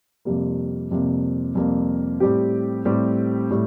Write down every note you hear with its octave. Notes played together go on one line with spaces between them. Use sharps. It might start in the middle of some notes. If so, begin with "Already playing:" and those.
F2 C3 G3 A#3
F2 C3 G3 A#3
F2 C3 G3 A#3
A2 G3 C4 G4
A2 G3 C4 G4
A2 G3